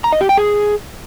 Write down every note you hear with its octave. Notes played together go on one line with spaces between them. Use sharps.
A#5
D#5
G4
G5
G#4